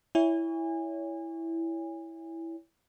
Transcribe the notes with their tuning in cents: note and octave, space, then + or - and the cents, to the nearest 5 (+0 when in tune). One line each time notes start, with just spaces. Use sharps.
E4 +0 C#5 +25 G#5 -30